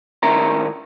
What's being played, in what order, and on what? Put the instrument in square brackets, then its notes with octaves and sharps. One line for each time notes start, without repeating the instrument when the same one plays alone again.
[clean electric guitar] A2 D#3 C#4 A#4 E5 A#5